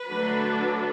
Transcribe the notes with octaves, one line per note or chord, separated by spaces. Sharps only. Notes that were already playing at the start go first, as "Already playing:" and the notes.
Already playing: B4
D3 F#3 A3 D4